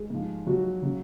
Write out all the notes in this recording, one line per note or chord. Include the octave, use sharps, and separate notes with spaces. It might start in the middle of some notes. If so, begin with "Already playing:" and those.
Already playing: G#3 G#4
G#2 F3
F#3 F#4
C#3 F#3